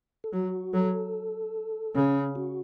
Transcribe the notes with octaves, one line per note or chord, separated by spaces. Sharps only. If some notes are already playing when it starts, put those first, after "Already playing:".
A4
F#3 F#4
F#3 A4
C#3 C#4
F#4